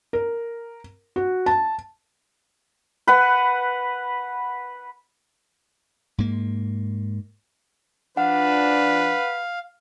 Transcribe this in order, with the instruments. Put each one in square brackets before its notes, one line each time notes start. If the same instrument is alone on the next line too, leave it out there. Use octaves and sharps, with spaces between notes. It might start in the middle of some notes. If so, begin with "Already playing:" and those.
[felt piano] A#4
F#4
A5
[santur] B4 F#5
[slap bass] G#2 A#3
[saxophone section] F3 D4 [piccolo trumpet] B4 [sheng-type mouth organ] F5 [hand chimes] F#5